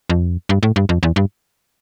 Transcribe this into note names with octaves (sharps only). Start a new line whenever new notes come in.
F2
G2
A2
G2
F2
E2
G2